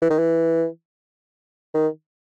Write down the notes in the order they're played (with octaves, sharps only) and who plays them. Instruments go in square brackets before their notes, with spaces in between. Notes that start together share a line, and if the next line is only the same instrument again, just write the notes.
[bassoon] E3
D#3
E3
D#3